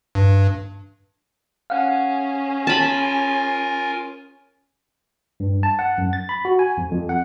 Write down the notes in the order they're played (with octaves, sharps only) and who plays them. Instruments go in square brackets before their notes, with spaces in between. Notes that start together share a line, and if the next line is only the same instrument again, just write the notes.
[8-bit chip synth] G2
[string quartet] C#4 G#4 [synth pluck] F5 F#5
[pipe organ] F4 A#4 G#5 [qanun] A5 B5
[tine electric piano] G2
A5
F#5
F#2
A6
B5
F#4
G#5
F2
F2
F#5